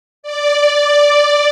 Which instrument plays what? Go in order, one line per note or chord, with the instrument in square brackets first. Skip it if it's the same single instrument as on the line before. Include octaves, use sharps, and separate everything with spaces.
[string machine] D5